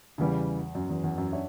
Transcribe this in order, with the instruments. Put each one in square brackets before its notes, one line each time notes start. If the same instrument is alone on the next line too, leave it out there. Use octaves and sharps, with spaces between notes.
[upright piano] E2 [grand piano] C#3 E3 G3
[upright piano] F#2
E2
E2
F#2
[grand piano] D4 F#4 C#5 E5